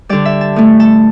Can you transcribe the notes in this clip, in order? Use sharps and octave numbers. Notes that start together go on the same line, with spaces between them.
D3 G3 D5
E5
A5
A2 A3
A5